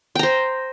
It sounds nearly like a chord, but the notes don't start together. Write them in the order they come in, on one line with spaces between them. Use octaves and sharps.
G5 A#5 C5